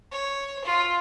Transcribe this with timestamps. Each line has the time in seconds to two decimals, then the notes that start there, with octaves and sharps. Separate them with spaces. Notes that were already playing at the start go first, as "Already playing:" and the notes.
0.12 C#5
0.64 F4